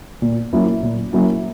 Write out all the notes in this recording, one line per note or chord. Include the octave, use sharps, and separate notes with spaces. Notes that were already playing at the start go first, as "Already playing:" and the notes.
A#2
F#3 A#3 C#4 E4
A#2
F#3 A#3 C#4 E4